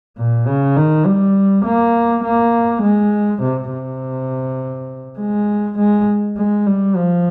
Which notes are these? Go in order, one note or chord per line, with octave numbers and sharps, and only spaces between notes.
A#2
C#3
D#3
G3
A#3
A#3
G#3
C3
C3
G#3
G#3
G#3
G3
F3